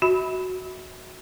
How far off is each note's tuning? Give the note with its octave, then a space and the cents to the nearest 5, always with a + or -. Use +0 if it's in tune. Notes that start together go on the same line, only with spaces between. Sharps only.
F#4 +0 E5 -35 B5 +0